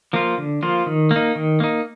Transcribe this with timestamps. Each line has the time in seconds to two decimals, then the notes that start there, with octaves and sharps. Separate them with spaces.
0.13 F3 A#3 F4
0.38 D3
0.63 F3 A#3 F4
0.86 D#3
1.11 A#3
1.16 D#4
1.35 D#3
1.60 A#3 D#4